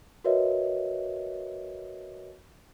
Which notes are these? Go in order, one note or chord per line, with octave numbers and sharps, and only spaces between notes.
F#4 A#4 B4 C#5 D#5 E5